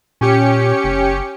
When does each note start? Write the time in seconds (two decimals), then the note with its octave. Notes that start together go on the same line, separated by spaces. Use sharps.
0.21 A#2 C#4 G4 C#7
0.84 F#1